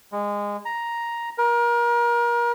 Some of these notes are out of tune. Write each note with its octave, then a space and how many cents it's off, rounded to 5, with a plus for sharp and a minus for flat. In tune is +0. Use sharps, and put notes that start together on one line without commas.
G#3 -20
A#5 +5
A#4 +30